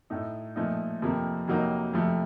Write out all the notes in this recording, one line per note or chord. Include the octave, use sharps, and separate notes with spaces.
A2 A3 D#4
A#2 F3 A3 D#4
F2 C3 F3 A#3
F2 C3 F#3 A#3 D#4
F2 C3 F3 A3